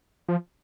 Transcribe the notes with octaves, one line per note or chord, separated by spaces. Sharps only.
F3